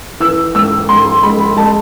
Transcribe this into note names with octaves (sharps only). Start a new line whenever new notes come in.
E3 E6
G#2 E6
G#2 C6
G#3 B5
G#3 A5